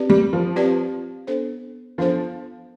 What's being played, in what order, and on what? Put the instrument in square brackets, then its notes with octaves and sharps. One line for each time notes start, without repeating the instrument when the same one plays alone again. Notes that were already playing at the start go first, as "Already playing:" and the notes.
Already playing: [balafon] C4 G4 B4 D5
[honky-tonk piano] G3
F3
[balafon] C4 G4 B4 D5
B3 D4 A4 C5
[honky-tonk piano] F3 [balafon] B3 D4 A4 C5